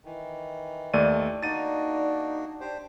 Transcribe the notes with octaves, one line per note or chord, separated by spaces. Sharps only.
D#3 E3
D#2 A3 D5 D#7
A#3 D4 D#4 F#4 A6 D#7
D4 G4 C5